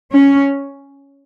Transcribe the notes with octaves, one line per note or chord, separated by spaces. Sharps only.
C#4